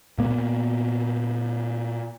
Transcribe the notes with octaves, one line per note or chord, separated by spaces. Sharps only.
A#2 A#3 B3